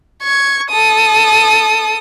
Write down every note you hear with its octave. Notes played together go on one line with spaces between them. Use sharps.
C#6 G#6
A4 D#6